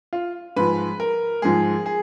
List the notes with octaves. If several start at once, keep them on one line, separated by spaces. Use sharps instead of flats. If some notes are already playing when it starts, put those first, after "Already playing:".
F4
G#2 F3 G#3 B4
A#4
G#2 F3 G#3 G#4
G#4